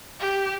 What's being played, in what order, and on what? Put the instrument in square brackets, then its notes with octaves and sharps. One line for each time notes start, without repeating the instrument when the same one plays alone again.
[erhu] G4